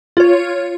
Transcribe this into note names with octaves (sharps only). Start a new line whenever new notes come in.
F4 C#5